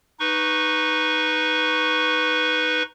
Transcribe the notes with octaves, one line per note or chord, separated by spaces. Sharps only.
D#4 B4 C#6